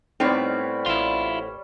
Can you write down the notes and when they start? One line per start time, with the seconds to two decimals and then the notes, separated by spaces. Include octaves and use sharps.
0.20 A2 G3 B3 C4 D#4 C#5 D5
0.86 A1 E4 F4